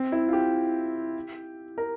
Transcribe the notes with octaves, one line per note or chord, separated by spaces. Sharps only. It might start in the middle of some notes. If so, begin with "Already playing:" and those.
Already playing: C4
E4
F4
G4
A#4